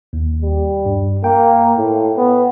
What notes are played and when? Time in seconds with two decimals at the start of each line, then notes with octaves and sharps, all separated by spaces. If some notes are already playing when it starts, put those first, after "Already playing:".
0.13 D#2
0.42 G3
0.85 G2
1.24 A#3 G5
1.77 A2
2.17 B3